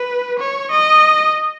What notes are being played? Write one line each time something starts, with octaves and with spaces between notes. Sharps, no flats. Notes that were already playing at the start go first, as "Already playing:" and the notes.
Already playing: B4
C#5
D#5